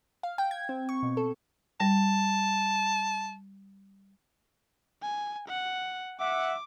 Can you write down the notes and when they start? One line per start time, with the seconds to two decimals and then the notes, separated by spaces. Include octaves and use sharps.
0.23 F5
0.38 G5
0.51 G#6
0.69 C4
0.89 C#6
1.03 B2
1.17 A4
1.80 G3 A5
5.02 G#5
5.48 F#5
6.19 E5 F#5 D6